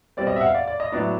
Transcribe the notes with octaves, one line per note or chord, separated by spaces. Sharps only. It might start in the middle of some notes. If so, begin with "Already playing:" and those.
B2 G3 C4 D5
D#5
E5
F#5
F5
D5
D5
D#5
A2 F#3 B3 D4 D5